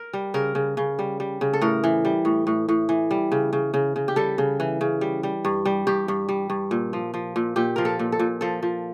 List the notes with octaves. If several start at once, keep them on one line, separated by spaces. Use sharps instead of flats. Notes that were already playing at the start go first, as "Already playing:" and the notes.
Already playing: A#4
G3
C#3 A#4
C#3
C#3
G3
G3
C#3
A4
A2 A#4
E3
G3
A2
A2
A2
E3
G3
C#3
C#3
C#3
C#3
G4
G3 A4
C#3
E3
C#3
G3
G3
G2
G3
G2 G4
G2
G3
G2
A#2
F3
F3
A#2
A#2 G4
F3 A#4
A4
A#2
A4
A#2
F3 A4
F3